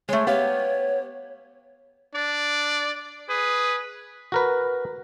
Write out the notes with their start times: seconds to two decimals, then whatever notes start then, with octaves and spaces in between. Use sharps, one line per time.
0.09 G#3 A3 C#5
0.27 B3 G4 C#5 F5
2.15 D4 D5
3.29 G#4 B4
4.32 F#4 A#4 B4